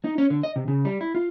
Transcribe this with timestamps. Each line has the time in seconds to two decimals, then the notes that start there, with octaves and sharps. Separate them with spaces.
0.04 D#4
0.18 C#4
0.30 D3
0.43 D#5
0.56 C3
0.68 C#3
0.85 G3
1.01 E4
1.15 F4